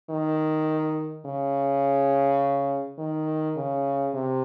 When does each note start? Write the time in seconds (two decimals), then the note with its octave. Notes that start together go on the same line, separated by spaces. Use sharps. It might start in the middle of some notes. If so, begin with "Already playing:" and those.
0.10 D#3
1.26 C#3
2.98 D#3
3.57 C#3
4.14 C3